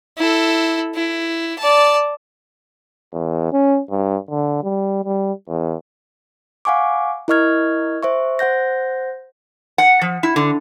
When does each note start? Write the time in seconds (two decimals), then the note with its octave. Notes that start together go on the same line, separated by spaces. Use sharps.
0.17 E4 A4
0.95 E4
1.59 D5 A5
3.13 E2
3.53 C#4
3.91 G2
4.31 D3
4.63 G3
5.05 G3
5.48 E2
6.65 F5 F#5 G#5 C#6 D6
7.28 E4 A#4 D#5 C#6 F6 G#6
8.03 C5 E5 C#6
8.39 C5 F#5 G6 A#6
9.78 F#5
10.01 F3
10.23 E4
10.36 D3